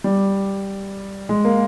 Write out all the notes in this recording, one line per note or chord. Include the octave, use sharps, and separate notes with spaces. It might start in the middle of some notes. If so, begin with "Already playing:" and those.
G3
G#3
A#3